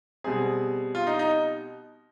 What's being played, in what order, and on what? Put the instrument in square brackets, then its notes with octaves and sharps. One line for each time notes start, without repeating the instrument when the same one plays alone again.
[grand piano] B2 G3 C4 G#4
F4
D#4
D#4